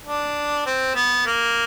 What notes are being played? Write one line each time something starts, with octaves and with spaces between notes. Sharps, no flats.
D4
C4
B3
A#3